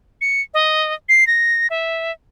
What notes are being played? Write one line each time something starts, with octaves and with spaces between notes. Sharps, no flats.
C#7
D#5
C7
A#6
E5